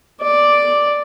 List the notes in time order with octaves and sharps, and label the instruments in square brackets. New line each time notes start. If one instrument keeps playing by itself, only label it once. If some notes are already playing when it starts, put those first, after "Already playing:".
[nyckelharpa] D5